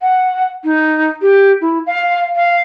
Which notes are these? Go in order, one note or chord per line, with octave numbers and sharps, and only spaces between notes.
F#5
D#4
G4
E4
F5
F5